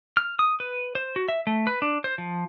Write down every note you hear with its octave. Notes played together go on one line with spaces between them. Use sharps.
F6
D#6
B4
C5
F#4
E5
A3
B4
D4
C5
F3